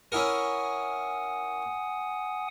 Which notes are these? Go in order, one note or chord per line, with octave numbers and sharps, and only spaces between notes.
C#4 E4 A#4 F#5 G#5 D#6